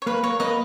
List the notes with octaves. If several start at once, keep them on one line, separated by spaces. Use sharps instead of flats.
C#5
A#3 B4
A#3 C#5
A#3 B4 D#5